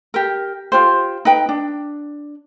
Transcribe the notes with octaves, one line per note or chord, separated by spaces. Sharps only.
G4 A#4
F4 G4 C5
D#4 B4 G5
D4